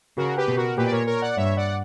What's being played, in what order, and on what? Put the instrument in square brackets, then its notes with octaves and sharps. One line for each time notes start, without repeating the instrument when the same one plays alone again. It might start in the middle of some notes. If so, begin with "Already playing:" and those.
[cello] C#3 [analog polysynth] F#4 A#4
[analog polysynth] G4 B4
[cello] B2
[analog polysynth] F#4 A#4
[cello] A#2 [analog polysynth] G4 B4
[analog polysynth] D5
A#4 C#5
A#4 C#5
D5 F#5
[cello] G2 [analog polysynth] C#5 E5
[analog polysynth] D5 F#5